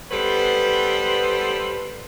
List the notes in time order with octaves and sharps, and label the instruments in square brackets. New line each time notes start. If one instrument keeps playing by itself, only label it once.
[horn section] G3 B3 A4 B4 C5